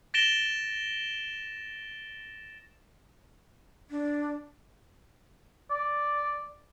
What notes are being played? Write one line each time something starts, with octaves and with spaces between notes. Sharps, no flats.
A6 A#6 D7 E7 G7
D4
D5